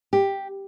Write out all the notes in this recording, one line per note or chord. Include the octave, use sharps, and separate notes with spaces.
G4